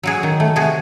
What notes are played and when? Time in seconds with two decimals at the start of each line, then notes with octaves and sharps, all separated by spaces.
0.03 F#3 F#4 G#4
0.23 D#3
0.40 A3
0.56 C3 F#4 G#4